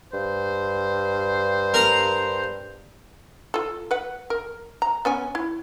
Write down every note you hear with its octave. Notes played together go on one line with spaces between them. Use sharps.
G2 C5
A#4 A#5
F4 A4
B4 F#5
A#4
A#5
B3 C#4 G#5
E4